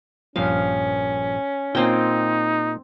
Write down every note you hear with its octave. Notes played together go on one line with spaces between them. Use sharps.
A#1 G2 F3 C#4 F5
A#2 A#3 C4 D#4 F4 G5